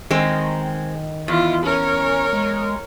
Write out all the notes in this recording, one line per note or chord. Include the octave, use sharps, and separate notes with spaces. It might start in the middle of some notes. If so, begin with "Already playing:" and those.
D#3 G#3 C4
E2 E4 F4
C#4 A#4 C#5
G#3